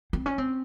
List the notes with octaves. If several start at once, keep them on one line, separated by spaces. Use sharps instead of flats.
C4
C#4
C4